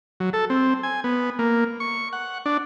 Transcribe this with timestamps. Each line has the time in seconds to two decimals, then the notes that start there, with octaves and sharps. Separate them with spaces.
0.20 F#3
0.33 A4
0.50 C4
0.83 G#5
1.04 B3
1.39 A#3
1.80 C#6
2.13 F#5
2.46 D4